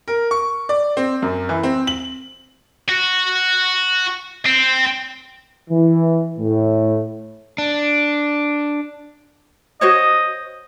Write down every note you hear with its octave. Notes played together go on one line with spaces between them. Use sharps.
A#4
C#6
D5
C4
F#2
E3
C4
F#7
F#4
C4
E3
A2
D4
F#4 C5 C#5 D#5